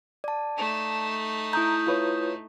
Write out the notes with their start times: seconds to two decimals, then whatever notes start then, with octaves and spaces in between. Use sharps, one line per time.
0.24 D5 A5
0.57 A3 D#4
1.53 E4 A#5 D#6 G6
1.87 F4 B4 C#5